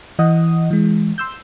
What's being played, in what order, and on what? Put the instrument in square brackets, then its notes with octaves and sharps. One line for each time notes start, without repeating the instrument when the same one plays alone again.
[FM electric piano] E3 D#5 F#5 D#6
E3 G#3
C6 E6 G6